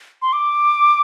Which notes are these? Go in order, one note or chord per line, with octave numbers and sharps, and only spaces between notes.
C6
D6